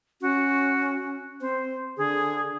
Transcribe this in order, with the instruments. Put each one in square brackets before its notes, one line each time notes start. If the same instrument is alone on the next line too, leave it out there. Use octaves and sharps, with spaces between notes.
[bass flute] C#4 [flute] F#4
[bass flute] C4 [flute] C5
[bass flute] D3 [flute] G#4